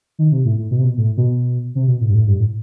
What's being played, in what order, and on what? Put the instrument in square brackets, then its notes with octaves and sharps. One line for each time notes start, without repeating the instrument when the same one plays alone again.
[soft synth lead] D#3
C3
A2
A2
B2
C3
B2
A2
B2
C3
B2
A2
G2
A2
G2
A2